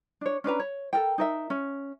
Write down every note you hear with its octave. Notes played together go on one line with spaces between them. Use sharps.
D4 C#5
C#4 D4 B4 A#5
C#5
A4 A#4 G5
D#4 A#4 E5
C#4